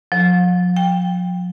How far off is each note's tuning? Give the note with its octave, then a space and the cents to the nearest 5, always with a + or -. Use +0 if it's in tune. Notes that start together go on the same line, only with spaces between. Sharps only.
F3 +45
G5 +20